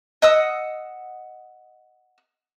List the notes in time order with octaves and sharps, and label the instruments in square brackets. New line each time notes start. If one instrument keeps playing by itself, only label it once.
[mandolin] D#5 F#5 D#6 E6